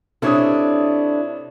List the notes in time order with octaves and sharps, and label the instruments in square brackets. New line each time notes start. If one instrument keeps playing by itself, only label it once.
[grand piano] C3 C#5 D#6 [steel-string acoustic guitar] D4 E4 A4